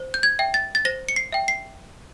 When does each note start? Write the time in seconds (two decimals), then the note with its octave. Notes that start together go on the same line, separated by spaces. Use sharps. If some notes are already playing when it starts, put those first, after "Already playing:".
Already playing: C5
0.14 G6
0.23 G#6
0.39 E5 G5
0.54 A6
0.75 A6
0.85 C5 A#6
1.09 C#7
1.16 C7
1.32 E5 G5
1.48 C7